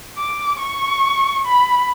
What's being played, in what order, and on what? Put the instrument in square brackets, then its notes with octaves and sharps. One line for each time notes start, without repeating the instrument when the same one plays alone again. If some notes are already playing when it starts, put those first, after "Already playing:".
[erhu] D6
C#6
B5